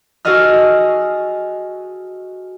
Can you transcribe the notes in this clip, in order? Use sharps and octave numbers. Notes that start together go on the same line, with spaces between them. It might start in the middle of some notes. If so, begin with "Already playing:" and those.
F#4 G#4 A4 D#5 F6